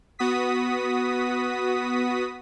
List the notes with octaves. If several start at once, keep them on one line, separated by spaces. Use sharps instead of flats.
B3 F#4 D#6 B6